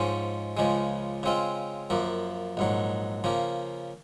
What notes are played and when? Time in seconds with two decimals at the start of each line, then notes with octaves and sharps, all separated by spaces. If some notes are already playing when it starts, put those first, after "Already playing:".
Already playing: G#2 F3 G#3 C#4
0.57 C#2 C#3 F3 G#3
1.23 C#3 G#3 C4 F4
1.90 F#2 F3 A#3
2.57 A#1 G#2 F#3
3.24 C#3 F3 A#3